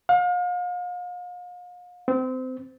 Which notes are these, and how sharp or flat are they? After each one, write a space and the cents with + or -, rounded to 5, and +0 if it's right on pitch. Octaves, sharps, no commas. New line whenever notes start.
F5 +40
C4 -25